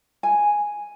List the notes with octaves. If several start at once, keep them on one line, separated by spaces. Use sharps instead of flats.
G#5